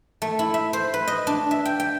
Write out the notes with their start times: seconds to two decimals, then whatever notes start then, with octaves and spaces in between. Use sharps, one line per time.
0.22 A3
0.39 E4
0.54 E5
0.73 C5
0.94 B4
1.07 D#5
1.27 D4
1.51 E5
1.65 G5
1.80 G5